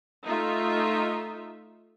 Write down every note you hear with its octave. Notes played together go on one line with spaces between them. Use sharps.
A3 D#4 F4 E5